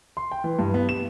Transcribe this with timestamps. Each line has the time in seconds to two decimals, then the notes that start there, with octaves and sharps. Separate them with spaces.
0.17 C6
0.31 G5
0.44 E3
0.59 G2
0.74 B3
0.89 E7